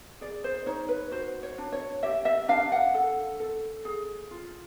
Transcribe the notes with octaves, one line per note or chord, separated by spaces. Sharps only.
G#4 D5
C5
D#4 C#5
B4
F#4 C5
C#5
D4
C#5
G4 E5
E5
D4 F5
F#5
A4
A4
G#4
F4